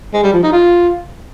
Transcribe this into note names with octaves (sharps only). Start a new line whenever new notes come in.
G#3
G3
F3
D#4
F4